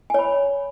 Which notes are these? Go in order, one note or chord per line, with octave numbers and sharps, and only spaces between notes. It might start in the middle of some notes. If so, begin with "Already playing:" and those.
C#5 G#5 B5